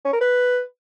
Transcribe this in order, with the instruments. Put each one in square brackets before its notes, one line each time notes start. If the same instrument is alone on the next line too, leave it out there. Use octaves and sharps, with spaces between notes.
[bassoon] C#4
A#4
B4